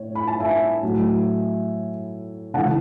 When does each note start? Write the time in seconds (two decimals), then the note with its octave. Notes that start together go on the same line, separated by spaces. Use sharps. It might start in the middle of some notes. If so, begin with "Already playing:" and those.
Already playing: A2 C#5
0.15 B5
0.27 A5
0.40 E5 G#5
0.83 A2 F#3 A3
2.54 C#3 E3 G#3 F#5 A5